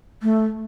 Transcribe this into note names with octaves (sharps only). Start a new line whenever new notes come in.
A3